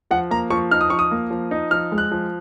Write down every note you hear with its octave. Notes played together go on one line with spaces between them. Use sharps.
F3 F#5
A#3 A#5
F3 C#6
D#4 F6
D#6
F3 C#6
D#6
A#3
F3
D#4
F3 F6
G#3
F#6
F3